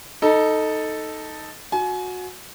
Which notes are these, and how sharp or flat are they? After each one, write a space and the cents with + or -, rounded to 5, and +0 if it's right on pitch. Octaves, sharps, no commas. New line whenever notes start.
D#4 +0 A4 +0 A#5 +45
F#4 -20 G#5 +30